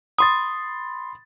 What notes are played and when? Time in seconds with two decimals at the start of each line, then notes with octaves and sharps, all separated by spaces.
0.19 B5 C6 D#6 A6